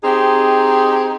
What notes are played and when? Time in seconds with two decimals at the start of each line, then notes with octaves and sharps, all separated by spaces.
0.04 C4 D#4 G4 G#4